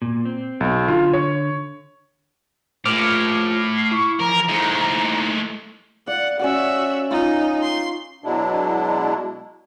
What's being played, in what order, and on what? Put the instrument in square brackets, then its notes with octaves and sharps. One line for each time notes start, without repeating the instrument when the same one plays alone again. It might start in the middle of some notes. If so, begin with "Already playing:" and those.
[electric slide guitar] A#2
C4
[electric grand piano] B1
[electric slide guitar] D3 [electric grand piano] F4
[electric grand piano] C#5
[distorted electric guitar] A2 [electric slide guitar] F4 A#4 C5 [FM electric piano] D6 F6
[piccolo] C7
[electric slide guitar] E4 [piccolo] C#6
[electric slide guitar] E3 F3 [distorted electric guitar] A#4 [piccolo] A#5
[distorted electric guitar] G#3 A3 [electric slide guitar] D#4 E4 C5
[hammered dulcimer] D5 F5 [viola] F#5
[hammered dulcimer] C#4 D5 F#5 [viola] F#4 E5
[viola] D#4 [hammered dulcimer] F4
[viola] C6
[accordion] B2 F#3 G#3 D4 E4